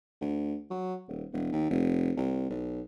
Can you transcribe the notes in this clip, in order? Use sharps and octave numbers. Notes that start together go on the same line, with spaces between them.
D2
F#3
D#1
E1
D#2
F1
C2
B1